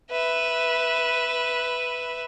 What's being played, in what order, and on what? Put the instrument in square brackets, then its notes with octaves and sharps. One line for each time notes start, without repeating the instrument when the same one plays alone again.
[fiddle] B4 E5